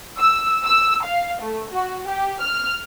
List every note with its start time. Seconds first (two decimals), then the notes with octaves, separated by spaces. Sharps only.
0.19 E6
0.64 E6
1.05 F5
1.42 A3
1.71 F#4
2.06 G4
2.40 F6